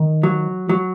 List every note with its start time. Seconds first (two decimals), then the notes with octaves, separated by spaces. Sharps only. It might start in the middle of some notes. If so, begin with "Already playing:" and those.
Already playing: D#3
0.23 F#3
0.69 F#3